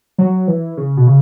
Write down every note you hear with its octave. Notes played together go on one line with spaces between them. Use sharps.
F#3
E3
C#3
B2
C#3